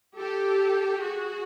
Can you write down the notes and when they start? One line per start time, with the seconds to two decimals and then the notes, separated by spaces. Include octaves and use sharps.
0.16 G4 A4
1.00 F#4 G#4